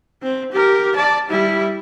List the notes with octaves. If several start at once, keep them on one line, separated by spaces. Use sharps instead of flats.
C4
G4 A#4
D5 A5
G3 E4